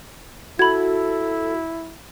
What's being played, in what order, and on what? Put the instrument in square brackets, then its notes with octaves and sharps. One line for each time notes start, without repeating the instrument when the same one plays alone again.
[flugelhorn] E4 [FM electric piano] F#4 [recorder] A4 [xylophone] B5 G#6